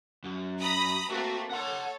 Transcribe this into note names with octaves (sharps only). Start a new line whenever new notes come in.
F#2
A#5 B5 D#6
A3 A#3 C4 F#4
A4 C#5 F#5 C6